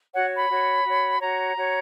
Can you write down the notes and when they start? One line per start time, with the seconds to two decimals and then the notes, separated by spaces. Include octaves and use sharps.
0.13 F#4 C#5 F#5
0.37 B5
0.49 F#4 C#5
0.85 F#4 C#5
1.20 F#4 C#5 A#5
1.56 F#4 C#5